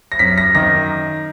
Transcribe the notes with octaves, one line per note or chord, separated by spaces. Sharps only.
A#6
F#2 B6
A#6
D#3 A#6